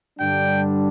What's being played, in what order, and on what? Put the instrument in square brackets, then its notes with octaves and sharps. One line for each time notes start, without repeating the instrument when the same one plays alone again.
[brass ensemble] G2 D3 G3 D4 G5